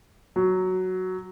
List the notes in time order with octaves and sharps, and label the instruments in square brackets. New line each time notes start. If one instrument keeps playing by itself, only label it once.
[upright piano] F#3